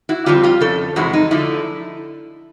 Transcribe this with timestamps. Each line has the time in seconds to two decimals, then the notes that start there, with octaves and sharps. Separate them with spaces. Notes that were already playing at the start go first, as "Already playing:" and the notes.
0.09 E4 F#4
0.26 F2 D3 G3 C4 F4 G4
0.43 F4 G4
0.61 F2 C#3 A4
0.96 F2 C3 E3 G#3 E4 F#4
1.13 D#4
1.31 D3 F3 A3 E4